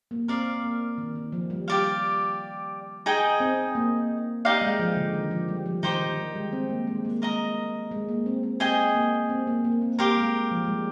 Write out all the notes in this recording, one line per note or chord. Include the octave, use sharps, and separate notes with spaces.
A#3
C4 A#4 D5 F5
A#3
D#3
D#3
F3
G3
G4 D5 F5
D#4 G#4 D#5 G5
C4
A#3
D#4 G4 D5 F5
G#3
F3
D3
D#3
F3
G3
F3
D#3 D#4 G4 C5
D#3
G3
G#3
C4
A#3
G#3
A#3
G#3 A#4 D#5 A#5
G#3
A#3
C4
C4
C4 G#4 D#5 G5
A#3
C4
A#3
A#3
C4
A#3 G4 A#4 F5 C6
G#3
F3
G#3
G3